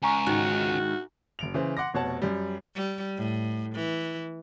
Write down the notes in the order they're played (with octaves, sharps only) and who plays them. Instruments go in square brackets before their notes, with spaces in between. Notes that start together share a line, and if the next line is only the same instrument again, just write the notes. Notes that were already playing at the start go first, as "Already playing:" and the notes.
[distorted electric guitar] C#2 [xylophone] G#5 A#5 C#6
[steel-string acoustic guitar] G#2 D#3 [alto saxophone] F#4
[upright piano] F#1 D7 F7
C#3 E3 C5
F#5 C6 D6 A#6
F1 B2 C#5 F#5 A5
F#2 G3
[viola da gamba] G3
A2
E3